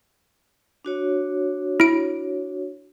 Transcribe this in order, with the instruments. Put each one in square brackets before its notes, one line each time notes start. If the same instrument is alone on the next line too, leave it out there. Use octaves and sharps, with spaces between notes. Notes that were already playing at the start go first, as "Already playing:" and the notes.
[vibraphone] D4 F#4 C#5
[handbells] E4 D7